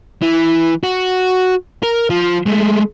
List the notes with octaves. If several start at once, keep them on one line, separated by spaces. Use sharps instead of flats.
E3
F#4
A#4
F3
G#3 A3